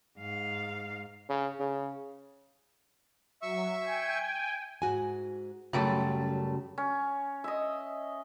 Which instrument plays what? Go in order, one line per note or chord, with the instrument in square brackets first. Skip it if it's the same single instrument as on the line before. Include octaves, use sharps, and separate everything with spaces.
[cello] G#2 F5
[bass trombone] C#3
C#3
[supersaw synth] F#3 [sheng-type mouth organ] E5 C#6 E6
[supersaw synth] G5 G#5
[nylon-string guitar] G#2 F#4 G#5
[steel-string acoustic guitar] F#2 G3 A3 [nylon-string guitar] C#3 F#3
[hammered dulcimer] C#4
D#5 E5